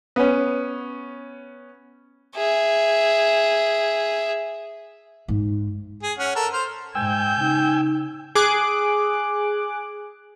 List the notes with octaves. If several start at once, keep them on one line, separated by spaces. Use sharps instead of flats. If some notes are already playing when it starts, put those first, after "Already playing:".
B3 C#4
G#4 E5
G#2
G#4
C#4 F#5 F6
A4 A#4
C5 F6
G#2 G5 G#5 E6 G6
C#3 D#4
G#4 D6 F#6